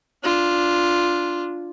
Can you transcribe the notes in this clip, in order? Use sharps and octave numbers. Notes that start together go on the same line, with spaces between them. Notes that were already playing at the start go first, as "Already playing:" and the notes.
D4 F4